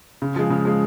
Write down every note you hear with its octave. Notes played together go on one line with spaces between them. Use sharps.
C#3
F3 G#3
C#3
F3 G#3